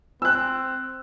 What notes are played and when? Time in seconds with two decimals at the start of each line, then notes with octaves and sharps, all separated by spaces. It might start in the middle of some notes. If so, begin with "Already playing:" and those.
0.22 C4 E6 F#6